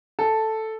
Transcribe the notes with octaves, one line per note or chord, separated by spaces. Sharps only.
A4